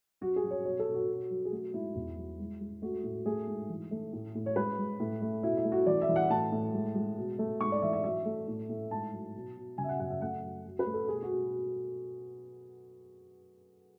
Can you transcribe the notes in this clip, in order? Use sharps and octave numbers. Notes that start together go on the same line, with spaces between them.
F#3 F#4
G#4
F#3
C#5
B2 C#5
A4
B2
F#4
B2
F#3
G#4
A3 F#4
G#2 E4
E2
F#3
G#3
G#3
A3 F#4
A2
A3 G#4
G#2
E3
A3
A2
A2
C#5
G#3 B4
G#3
A2
A3
B2 E4
E4
A3
F#4
E3 D5
E5
E3
F#5
A2 A5
A2
G#3
G#3
B2
A3
G#2 C#6
D5
E3 E5
E5
F#3 E5
A3
A2
A2
G#2 A5
F#3
B2
B2
C#3 G#5
E5
F#5
F#2 F#5
E5
A3 F#5
F#2
F#3
B4
A3
A4
B2 G#4
F#4
B2